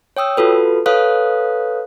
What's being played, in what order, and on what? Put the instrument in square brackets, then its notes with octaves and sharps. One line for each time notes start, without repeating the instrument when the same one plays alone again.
[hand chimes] C#5 G5 D#6 E6
F4 F#4 A4 B4
A4 B4 C#5 F5 D#6 F#6